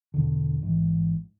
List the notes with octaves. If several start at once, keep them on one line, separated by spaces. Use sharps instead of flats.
E2 B2 D3
A1 G#2 E3